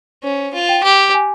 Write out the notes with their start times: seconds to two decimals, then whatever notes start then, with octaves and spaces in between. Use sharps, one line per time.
0.23 C#4 C5
0.54 F4
0.69 G5
0.83 G4
1.14 G#5